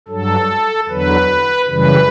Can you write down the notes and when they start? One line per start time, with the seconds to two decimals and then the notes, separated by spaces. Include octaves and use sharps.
0.08 G2 F#3 A4
0.89 E2 D3 F#3 B4
1.69 F#2 C#3 E3 G3 B4